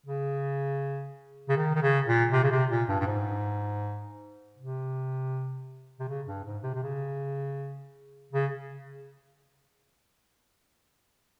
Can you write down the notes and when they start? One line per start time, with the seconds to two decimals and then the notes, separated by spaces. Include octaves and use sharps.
0.06 C#3
1.49 C#3
1.57 D#3
1.75 D#3
1.82 C#3
2.07 A#2
2.32 C3
2.43 C#3
2.51 C3
2.70 A#2
2.89 G2
3.00 G2
3.07 G#2
4.57 C3
6.00 C3
6.08 C#3
6.27 G2
6.45 G#2
6.63 C3
6.74 C3
6.83 C#3
8.33 C#3